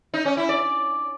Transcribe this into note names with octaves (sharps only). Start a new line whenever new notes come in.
D#4
C#4
E4
D5